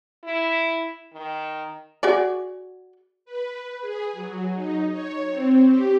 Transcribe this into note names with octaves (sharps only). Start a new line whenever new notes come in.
E4
D#3
F#4 G#4 D5
B4
G#4
F#3
D#4
C#5
C4
G4